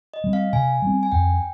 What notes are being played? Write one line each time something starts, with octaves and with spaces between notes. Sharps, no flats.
D#5
G3 C4
F5
C3 G#5
G3 C4
G#5
F2 G5